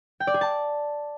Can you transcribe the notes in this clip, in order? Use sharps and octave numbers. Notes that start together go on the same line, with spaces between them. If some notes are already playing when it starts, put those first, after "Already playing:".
G5
D5
G#4
A5